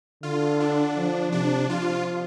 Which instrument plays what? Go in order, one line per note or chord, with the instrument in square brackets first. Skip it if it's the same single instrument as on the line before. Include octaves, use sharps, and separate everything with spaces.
[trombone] D3 [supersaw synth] F4
[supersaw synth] D4
[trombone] F3
[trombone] C3 [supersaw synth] D4
[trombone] F3 [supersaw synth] F4